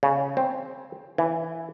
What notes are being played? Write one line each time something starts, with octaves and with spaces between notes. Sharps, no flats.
C#3
C4
E3